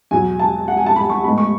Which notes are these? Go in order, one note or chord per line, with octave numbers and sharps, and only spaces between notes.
E2 B2 F#3 G#5
A5
F#5
G#5
A5
B5
C#6
A2 G#3 B3 B5
C#6